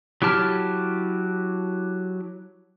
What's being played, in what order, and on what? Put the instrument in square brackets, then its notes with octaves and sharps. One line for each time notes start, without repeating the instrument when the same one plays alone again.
[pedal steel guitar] F#3 E4 G4 A5 F6